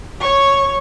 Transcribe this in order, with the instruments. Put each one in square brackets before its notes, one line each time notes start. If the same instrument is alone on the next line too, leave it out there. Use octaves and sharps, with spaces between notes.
[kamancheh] C#5 C#6